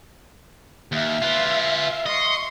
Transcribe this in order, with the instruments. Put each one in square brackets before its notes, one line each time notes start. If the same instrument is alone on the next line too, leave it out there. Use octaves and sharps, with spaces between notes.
[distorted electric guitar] D#2 [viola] E5 F5
[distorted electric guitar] F4 B4
[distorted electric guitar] D#5 [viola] C6 C#6